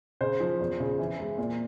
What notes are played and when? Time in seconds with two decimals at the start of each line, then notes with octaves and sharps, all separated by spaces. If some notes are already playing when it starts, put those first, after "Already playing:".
0.21 C#3 C5
0.40 F3
0.60 E2
0.80 C#3
0.99 E3
1.19 G#3
1.38 A#2